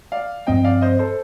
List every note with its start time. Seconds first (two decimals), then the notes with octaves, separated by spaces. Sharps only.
0.12 D5 F5
0.47 G2 F3 C4 D#5 G5
0.65 D5 F5
0.81 C5 D#5
0.99 A4 C5